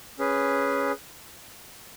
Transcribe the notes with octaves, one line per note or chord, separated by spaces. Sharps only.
C#4 G#4 B4